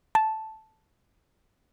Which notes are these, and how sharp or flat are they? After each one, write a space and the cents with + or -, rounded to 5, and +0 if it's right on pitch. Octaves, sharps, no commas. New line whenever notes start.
A5 -5